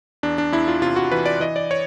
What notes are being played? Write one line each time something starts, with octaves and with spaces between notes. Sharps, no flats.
E2 D4
D4
E2 E4
F4
C3 F4
F#4
E3 B4
D5
E3 D#5
D5
C#5